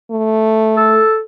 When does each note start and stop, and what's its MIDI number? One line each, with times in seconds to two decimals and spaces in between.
0.11 1.01 57
0.77 1.21 69